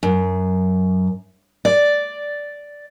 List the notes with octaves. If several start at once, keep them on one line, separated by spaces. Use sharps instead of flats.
F#2
D5